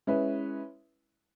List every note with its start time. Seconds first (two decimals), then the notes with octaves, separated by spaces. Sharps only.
0.07 G#3 C#4 E4 B4 E5